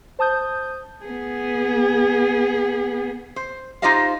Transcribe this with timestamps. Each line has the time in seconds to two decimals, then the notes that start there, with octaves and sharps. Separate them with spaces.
0.19 C5 A5 D#6 G6
1.05 B3 G#4
3.36 C5
3.82 D#4 F4 G4 C5 D#5 F5